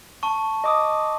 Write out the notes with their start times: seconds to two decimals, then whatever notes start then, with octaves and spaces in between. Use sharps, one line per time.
0.23 A5 C#6
0.64 D#5 D6 D#6